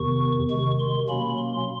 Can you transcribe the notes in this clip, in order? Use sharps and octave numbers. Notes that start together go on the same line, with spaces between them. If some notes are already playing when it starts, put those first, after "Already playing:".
Already playing: E2 C3 D#3 C#6
C3 D#3 G#3 C#6
C6
B2 F#3 A#3 C#4 B5
C6